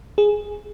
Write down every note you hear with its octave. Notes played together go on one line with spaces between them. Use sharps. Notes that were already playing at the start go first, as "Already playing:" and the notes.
G#4